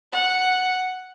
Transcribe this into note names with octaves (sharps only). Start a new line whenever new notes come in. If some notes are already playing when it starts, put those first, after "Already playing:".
F#5